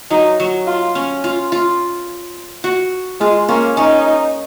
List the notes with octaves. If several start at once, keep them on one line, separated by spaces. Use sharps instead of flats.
F#3 D#4
F#3
F4
C#4
F4
F4
F#4
G#3 F4
A#3 C#4
C#4 D#4